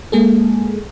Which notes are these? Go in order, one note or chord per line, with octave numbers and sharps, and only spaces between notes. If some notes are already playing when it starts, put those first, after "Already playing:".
G#3 A#3 G#4 A4